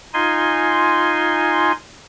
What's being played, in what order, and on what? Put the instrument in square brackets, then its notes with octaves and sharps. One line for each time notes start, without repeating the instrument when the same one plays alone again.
[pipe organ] D#4 F4 G#5 C6